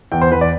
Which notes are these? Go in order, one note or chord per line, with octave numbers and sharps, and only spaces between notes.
E2 G5
C5
E2 B4
D5